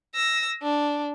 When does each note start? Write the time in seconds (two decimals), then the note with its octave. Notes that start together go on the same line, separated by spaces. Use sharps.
0.15 E6 A#6
0.62 D4